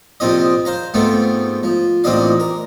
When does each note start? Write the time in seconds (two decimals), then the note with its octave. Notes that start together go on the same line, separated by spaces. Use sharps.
0.20 A#1 C3 C4 F4 D#5
0.65 C5 F5 A#5
0.94 G#2 A3 B3 C4 F4
1.63 F3
2.04 A1 A#2 C4 D4 D#5 F5
2.40 A#4